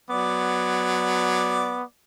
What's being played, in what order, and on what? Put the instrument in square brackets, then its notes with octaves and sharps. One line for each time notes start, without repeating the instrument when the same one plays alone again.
[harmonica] F#3 D5 D6 [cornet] B3